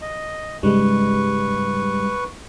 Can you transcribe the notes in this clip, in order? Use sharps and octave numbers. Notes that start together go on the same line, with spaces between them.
D#5
G#2 C#3 G3 G#3 B4 C#6